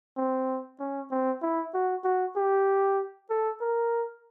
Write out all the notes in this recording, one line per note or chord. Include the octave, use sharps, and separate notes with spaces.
C4
C#4
C4
E4
F#4
F#4
G4
A4
A#4